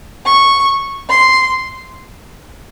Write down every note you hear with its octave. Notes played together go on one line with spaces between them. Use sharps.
C#6
C6